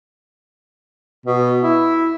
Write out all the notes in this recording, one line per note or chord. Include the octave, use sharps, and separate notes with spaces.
B2
E4